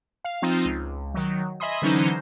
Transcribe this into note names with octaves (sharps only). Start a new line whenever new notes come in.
F5
F3 C4 D#4 F4
C#2
D#3 F#3
D#5 E5 G#5 B5 C6 D#6
D3 E3 F#3 C#4 D#4 C5